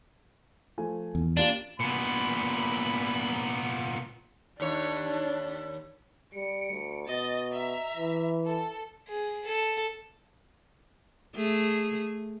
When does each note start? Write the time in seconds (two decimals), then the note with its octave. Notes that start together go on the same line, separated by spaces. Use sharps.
0.78 F3 A3 G#5
1.15 E2
1.37 A#3 D4 F4 G4
1.80 G2 A#2 B3 G#5 B5
4.60 D#2 D4 C#5
6.34 G3 C#7 D7
6.71 D2
7.07 B2 D#5 A6
7.50 E5 A#5
7.96 E3
8.47 A4
9.08 G#4
9.46 A4
11.36 A3 G#4